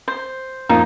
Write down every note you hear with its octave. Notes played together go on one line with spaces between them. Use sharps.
C5
F2 A#3 D#4 F4